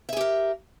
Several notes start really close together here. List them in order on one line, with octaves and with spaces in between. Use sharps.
E5 G#4 G4 A#4